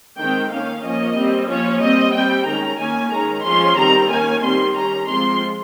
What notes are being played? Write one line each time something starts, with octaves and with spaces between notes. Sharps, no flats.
D#3 G#3 C4 G5
D#3 A#3 C#4 F5
F3 A#3 C#4 D#5
G3 C4
F3 A#3 C#4 C#5
G3 C4 D#5
G3 C4 G5
D#3 G#3 C#4 A#5
D#3 A#3 C#4 G#5
D#3 G#3 C#4 A#5
F3 G#3 C#4 C6
D#3 G3 C4 A#5
D#3 A#3 C#4 G#5
D#3 G3 C4 C6
D#3 G3 C#4 A#5
F3 G#3 C4 C6